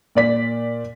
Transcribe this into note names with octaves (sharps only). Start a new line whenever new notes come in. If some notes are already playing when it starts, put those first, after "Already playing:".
A#2 D5 B6